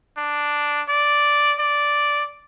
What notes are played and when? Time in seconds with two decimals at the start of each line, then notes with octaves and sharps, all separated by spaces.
0.17 D4
0.89 D5
1.60 D5